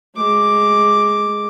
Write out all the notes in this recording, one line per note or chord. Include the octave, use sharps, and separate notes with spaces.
G#3 D6